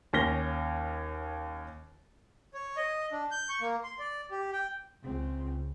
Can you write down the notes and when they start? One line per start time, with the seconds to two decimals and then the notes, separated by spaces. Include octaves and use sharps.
0.13 D#2 C#4 F6 A#6 G7
2.54 C#5
2.77 D#5
3.12 D4
3.31 G6
3.49 C#6
3.61 A#3
3.84 C6
3.99 D5
4.31 G4
4.53 G5
5.04 C#2 C4